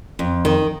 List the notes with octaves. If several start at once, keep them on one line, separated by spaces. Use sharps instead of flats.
F2
D#3